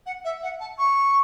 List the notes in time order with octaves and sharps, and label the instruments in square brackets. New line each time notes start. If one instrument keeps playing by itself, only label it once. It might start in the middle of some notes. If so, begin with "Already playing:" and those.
[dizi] F#5
E5
F#5
A5
C#6